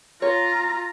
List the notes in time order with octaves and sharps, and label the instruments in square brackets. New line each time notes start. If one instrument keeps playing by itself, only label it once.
[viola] F4 A#5 [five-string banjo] C#5